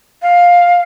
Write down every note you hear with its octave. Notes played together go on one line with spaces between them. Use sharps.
F5